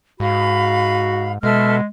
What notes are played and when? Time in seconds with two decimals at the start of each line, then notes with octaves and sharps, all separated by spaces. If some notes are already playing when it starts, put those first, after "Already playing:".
0.20 G#2 F#4 F5 B5
1.43 B2 G#3 A4 E5 F6